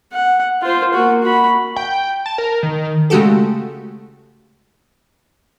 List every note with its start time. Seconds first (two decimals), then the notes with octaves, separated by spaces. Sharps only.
0.13 F#5
0.62 F4 C5
0.94 A#3 F#4
1.23 F#4 B5
1.76 G5
2.26 A5
2.38 A#4
2.63 D#3
3.10 C#3 G#3 A3 F#4 G4 A4